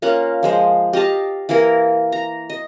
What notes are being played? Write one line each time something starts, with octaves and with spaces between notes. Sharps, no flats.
A#3 C#4 F4 F#5
F3 G#3 C5
G4 D#5 F5 A5
E3 A#3 E4 A#4
A#5
D#5